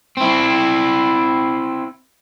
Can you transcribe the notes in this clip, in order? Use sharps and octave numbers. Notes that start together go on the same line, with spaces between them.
C4 E4